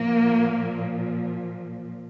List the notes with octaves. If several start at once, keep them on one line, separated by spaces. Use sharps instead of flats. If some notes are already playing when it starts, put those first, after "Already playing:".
Already playing: A#2 F3 A#3